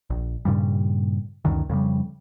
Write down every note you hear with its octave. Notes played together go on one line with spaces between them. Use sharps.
A#1
G2 A#2 C#3 G3
C#2 F#2 D3 D#3
F2 C#3 G3